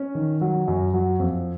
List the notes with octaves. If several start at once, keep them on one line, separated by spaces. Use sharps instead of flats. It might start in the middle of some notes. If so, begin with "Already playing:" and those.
Already playing: C#4
D#3
F#3
F#2
F#3
F2